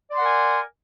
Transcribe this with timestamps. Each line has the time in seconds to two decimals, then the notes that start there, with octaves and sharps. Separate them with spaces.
0.08 D5
0.12 C6
0.16 F#5
0.21 A#4
0.25 G#5